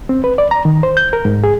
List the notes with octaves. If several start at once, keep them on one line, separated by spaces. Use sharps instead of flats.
C4
B4
D5
A#5
D#3
C5
G6
A#4
G#2
G#4